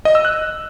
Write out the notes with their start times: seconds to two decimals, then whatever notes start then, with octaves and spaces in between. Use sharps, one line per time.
0.05 D#5
0.15 E6
0.25 F#6